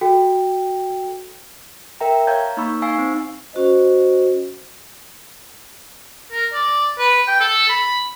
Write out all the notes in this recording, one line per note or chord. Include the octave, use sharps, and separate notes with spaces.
F#4 A4 G5
A#4 E5 G5 A#5
C#5 F5 A5 A#5 G6 G#6
A#3 D#4 B5 C#6 E6
D#4 F5 G#5 C#6 E6 C7
C4
C#4 F#4 C5 D#5
A#4
D5
B4
G5
A4
B5